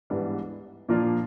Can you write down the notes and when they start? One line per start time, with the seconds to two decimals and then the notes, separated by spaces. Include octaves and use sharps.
0.10 G#2 E3 G3 B3 D4
0.89 A#2 F3 A#3 D4 F4